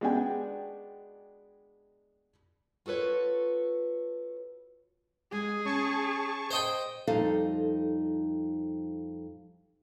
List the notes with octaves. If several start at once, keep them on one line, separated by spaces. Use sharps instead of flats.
G#3 B3 D4 F#4 G5 G#5
F4 F#4 A4 B4 C#5
G#3 G#4
C#4 A5 C#6
C5 D#5 G5
F2 G3 D#4 A4 F5